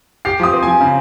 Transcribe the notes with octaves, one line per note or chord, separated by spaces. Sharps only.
G4 C7
F3 D#6
C4
F3 G#5
C#3